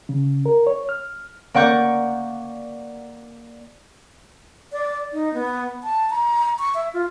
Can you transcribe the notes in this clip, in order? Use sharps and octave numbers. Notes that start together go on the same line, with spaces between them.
C#3
A#4
C#5
F6
A#3 D5 F#5 C#6 G6
D5
D#4
B3
A5
A#5
C#6
E5
F4